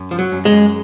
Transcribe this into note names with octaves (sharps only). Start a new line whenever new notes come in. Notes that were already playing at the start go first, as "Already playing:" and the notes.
Already playing: F#2
F3
F#3
F#2
G#3
F#2